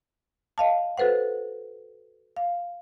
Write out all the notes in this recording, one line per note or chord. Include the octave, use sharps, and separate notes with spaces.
D#5 F5 A5
F#4 A4 B4 C5 F#5
F5